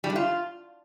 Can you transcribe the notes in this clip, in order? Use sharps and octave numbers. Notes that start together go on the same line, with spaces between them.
G3
D4
F4